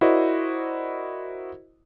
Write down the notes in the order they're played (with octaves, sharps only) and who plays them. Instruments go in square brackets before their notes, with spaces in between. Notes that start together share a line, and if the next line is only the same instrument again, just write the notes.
[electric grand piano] E4 F#4 A#4 C5 D5 D#5